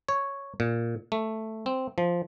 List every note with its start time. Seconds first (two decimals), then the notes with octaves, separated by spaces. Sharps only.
0.09 C#5
0.60 A#2
1.12 A3
1.66 C4
1.98 F3